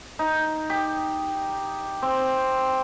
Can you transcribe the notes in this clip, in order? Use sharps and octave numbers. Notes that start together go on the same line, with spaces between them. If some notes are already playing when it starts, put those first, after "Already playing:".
D#4
G4
C4